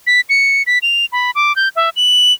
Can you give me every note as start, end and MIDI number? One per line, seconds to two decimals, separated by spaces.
0.07 0.21 95
0.29 0.63 97
0.67 0.79 95
0.82 1.06 101
1.12 1.31 83
1.35 1.55 86
1.56 1.69 91
1.76 1.90 76
1.96 2.33 102